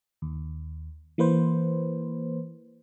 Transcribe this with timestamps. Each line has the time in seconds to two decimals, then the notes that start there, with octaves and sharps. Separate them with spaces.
0.22 D#2
1.18 E3 A#3 B4 C5